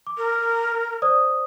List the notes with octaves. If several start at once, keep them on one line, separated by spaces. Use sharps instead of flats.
D6
A#4
C5 D5 D#6